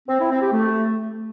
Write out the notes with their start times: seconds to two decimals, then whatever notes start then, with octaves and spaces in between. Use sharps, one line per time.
0.08 C4
0.19 E4
0.30 C4
0.41 G4
0.52 A3